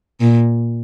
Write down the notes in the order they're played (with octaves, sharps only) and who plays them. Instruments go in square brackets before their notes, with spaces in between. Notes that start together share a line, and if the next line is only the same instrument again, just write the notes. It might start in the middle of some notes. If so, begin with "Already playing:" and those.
[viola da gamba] A#2